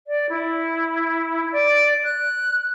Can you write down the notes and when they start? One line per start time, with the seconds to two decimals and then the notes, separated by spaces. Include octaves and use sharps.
0.07 D5
0.30 E4
1.52 D5
2.04 F#6